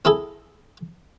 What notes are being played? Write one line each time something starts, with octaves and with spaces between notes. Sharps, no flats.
C4 E4 G#4 A4